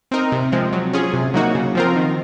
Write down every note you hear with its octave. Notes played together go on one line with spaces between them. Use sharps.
C4 D#4 A#4
C3
F3 G#3 C4
F#3
C#4 F4 G#4
C3
F#3 A#3 D#4 F#4
C#3
F3 C4 F4 A#4
D#3